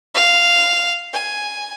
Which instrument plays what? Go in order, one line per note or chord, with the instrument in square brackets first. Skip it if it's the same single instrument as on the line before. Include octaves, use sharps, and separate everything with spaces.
[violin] F5
G#5